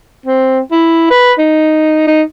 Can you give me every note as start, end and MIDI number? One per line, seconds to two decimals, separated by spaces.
0.26 0.60 60
0.72 1.08 64
1.11 1.33 71
1.39 2.04 63
2.07 2.23 63